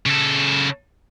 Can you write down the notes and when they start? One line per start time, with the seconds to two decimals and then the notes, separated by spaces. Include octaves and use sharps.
0.06 C#3 A4